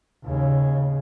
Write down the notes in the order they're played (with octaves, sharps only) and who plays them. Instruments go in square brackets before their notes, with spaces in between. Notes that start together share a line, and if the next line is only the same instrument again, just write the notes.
[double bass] D#2 C#3